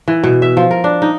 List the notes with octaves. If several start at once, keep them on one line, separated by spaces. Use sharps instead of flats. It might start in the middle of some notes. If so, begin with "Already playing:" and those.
E3
B2
E5
F3
A#4
D4
D#4